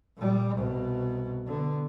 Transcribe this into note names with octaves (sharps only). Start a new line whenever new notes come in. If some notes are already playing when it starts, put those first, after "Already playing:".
A#2 G3
C2 B2
D3 B3